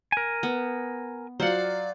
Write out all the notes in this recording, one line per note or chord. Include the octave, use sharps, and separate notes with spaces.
A#4 G#5
B3
F#3 F4 C5 D5 F#5